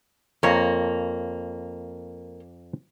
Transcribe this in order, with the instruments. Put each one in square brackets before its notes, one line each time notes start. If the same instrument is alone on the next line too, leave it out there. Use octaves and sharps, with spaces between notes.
[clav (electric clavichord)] F2 C#5 A#5 [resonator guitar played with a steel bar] A#3